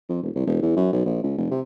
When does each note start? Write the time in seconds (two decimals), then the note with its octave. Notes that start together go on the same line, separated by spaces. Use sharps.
0.09 F2
0.22 E1
0.35 C2
0.47 E1
0.62 E2
0.76 F#2
0.93 B1
1.06 A#1
1.23 C#2
1.38 F1
1.51 C3